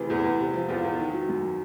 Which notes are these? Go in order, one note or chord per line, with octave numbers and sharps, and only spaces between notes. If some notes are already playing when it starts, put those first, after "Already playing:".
Already playing: D2 C3 E3 G#4
E2
E2
C3
F3
E2 F4
E2
D#3
F#3
F#2